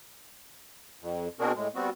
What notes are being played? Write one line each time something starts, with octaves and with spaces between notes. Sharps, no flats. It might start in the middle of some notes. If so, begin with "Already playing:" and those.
F2
B2 C4 D4 F#4 G#4 A#4
A2 G#3
G3 B3 C4 F#4